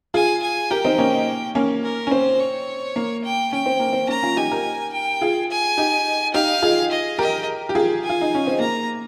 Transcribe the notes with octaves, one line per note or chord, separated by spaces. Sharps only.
F4 G#4 G#5
G#5
G4 A#4 G5
C4 D#4
A#3 C#4
A#3 C#4
A#4
C#4
C4 C5
C#5
A#3
G5
C#4 G5
C4
A#3
C4
A#3 C#4 A#5
C#4 F4
D#4 G4 G#5
G4 A#4
G5
F4 G#4
G#5
D#4 G4
D#4 G4 F5
F4 G#4
D#5
G4 A#4 D#5
G4
F4 G#4
G#5
F4
D#4
C#4
C4
A#3 A#5